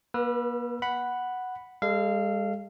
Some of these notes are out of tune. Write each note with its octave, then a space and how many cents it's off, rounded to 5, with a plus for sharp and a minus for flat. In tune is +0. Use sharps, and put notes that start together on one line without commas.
A#3 +40 B4 -20 E6 +35
F#5 +0 B5 +0
G#3 -45 A4 +0 F5 -20